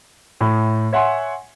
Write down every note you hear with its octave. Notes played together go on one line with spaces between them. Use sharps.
A2
C#5 E5 F#5 G#5 C6